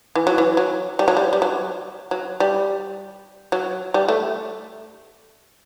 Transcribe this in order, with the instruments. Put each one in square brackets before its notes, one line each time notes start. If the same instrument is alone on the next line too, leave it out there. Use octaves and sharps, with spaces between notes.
[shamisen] E3
F#3
E3
F#3
G3
F#3
G3
G3
F#3
F#3
G3
F#3
G3
A3